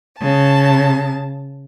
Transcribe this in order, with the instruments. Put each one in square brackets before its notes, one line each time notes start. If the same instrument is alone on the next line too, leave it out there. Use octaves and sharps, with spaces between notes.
[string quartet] C#3 A5